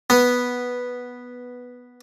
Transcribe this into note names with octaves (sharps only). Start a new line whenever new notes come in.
B3